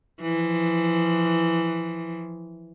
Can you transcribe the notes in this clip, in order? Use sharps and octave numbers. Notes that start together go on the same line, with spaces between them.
E3 F3